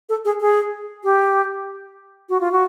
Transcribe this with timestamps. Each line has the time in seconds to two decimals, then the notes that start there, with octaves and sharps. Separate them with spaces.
0.09 A4
0.25 G#4
0.40 G#4
1.04 G4
2.29 F#4
2.41 F4
2.52 F#4